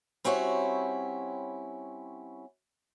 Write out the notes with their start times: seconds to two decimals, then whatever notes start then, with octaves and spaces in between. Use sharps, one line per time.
0.24 G3 C4 C#4 E4 F#4 C#5